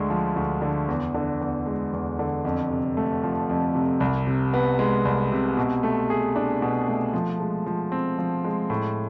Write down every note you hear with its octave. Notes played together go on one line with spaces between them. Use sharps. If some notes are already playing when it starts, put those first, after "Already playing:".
Already playing: D2 D3 G#3
F3
D2
D3
E2
D3
E2
G#3
E2
D3
F2
C3
A3
F3
F2
C3
C2
C3
B3
G#3
C2
C3
B2
A3
G#4
D4
B2
A3
F3
G#3
F3
C4
F3
G#3
A2